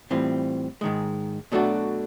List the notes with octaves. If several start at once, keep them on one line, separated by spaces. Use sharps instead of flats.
A2 E3 G3 C4 F4
G#2 D#3 G#3
B2 F#3 A3 D4 F#4